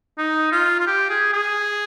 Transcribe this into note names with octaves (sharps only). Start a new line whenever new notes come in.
D#4
F4
F4
G4
G#4
G#4